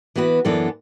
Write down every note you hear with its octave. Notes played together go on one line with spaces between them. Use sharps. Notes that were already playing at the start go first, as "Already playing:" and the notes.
E3 B3 F#4 B4
F#2 E3 B3 D4 A4